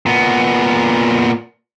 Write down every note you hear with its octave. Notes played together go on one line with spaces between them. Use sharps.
A#2 B3